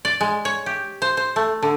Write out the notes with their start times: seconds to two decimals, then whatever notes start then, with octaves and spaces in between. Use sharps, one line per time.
0.05 D5
0.21 G#3
0.45 C#5
0.66 G4
1.02 C5
1.17 C5
1.36 A3
1.63 D3